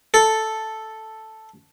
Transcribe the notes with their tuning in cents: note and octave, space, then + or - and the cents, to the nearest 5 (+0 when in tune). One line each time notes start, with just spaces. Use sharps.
A4 +0